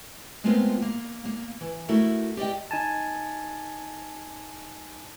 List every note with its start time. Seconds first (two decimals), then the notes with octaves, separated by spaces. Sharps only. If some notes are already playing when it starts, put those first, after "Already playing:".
0.44 G#3 A3 B3 C4 F4 A#4
0.82 A#3
1.25 A#3
1.61 E3
1.88 A3 E4 F#4 A4 A#4
2.37 G4 D5 D#5 G5
2.71 D#4 G#5 A5